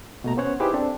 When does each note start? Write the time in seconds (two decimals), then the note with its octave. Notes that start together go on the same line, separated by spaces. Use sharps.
0.24 B2 A3 A#5
0.37 B3 C#4 C5 C#5 F#5
0.60 D#4 E4 G4 G#4 B4 C5
0.74 C4 D4 A4